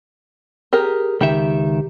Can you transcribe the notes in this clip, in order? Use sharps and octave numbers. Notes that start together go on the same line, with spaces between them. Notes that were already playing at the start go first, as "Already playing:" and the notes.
G4 G#4 A#4
C#2 D#3 G4 E5